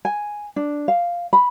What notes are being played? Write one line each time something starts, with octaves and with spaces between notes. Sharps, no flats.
G#5
D4
F5
B5